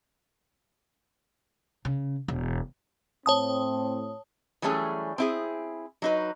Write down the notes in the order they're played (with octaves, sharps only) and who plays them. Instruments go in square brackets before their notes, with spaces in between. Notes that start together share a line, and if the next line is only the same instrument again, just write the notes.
[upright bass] C#3
E1
[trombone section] A2 C4 [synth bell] C#5 A5 D#6
[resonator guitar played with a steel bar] E3 F#3 G3 A3 C#4 G#4
C4 E4 G#4
F#3 D#4 B4